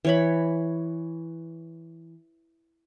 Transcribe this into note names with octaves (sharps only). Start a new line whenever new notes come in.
E3 C#5 B5